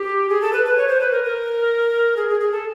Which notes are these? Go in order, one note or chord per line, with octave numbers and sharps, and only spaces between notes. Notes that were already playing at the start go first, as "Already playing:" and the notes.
Already playing: G4
G#4
A4
B4
B4
C#5
C5
B4
A#4
A#4
G#4
G#4
G#4
A4